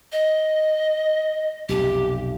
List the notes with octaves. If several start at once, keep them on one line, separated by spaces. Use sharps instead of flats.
D#5
B1 F2 C3 G4